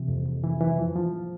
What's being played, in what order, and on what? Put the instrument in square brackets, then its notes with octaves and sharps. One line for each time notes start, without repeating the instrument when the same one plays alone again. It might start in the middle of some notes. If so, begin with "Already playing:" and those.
Already playing: [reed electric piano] C3 E3
F2
F2
E3
E3
F3
F3